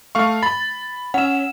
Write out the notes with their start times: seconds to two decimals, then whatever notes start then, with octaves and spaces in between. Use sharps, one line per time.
0.15 A3 F5 C#6
0.43 B5 A6
1.14 C#4 F#5 E7